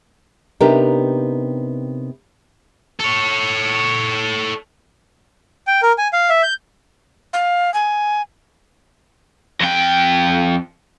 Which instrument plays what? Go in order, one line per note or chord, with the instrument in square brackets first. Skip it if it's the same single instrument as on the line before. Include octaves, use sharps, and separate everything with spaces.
[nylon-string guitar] C3 B3 D4 D#4 G4 A#4
[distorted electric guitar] A4 C#5
[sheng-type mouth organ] G5
A#4
G#5
F5
E5
G6
[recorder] F5
G#5
[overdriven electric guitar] F2 G5